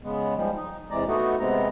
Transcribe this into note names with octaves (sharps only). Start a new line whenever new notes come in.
C#3 G#3 B3
G#2 F3 G3 G#3
D#4
E2 C3 E3 G#3 D5 A#5
A3 B3 D#4 F#4
C3 G#3 B3 C4 A#5